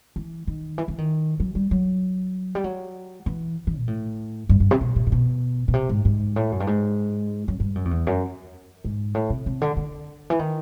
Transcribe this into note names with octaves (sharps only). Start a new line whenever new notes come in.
E3
D#3
E3
E3
D#3
F#3
G3
F#3
G3
F#3
E3
E3
A#2
A2
G2
G2
C3
B2
A#2
A#2
B2
B2
C3
G#2
G#2
A2
F#2
G2
G#2
F#2
G2
F#2
F2
E2
F#2
G#2
A2
C3
C3
D3
D3
E3
D#3